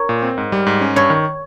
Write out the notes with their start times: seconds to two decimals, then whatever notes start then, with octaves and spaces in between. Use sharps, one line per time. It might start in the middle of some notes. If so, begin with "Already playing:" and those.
Already playing: A#4 C#5
0.09 A#2
0.22 C4
0.38 G#2
0.52 G3
0.66 G#2
0.81 C#4
0.96 G2 C#5
1.10 D#3